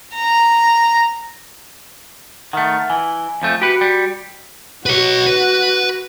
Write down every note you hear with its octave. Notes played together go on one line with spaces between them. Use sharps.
A#5
D#3 A3 F#5 F6 A6
E3 G#5
F2 F3 A3
F#4 G4 B4 C#7
G3
F#4 B4 C#5
B4